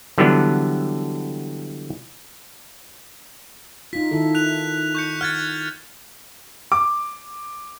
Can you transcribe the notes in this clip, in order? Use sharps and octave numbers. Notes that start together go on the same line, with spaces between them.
D3 E3 F#3 G3 B3 D4
D#4 F4 B6
D#3 E4 A4
F#6 F7
C#6 G6 C#7
F#5 F6 G#6 A6
D6